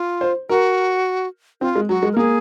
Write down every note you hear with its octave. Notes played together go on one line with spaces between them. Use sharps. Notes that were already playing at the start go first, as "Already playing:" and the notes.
Already playing: F4
C5
F#4 A#4
C4 F4
G#3
F#3 F#4
G#3
A#4
A#3 G#4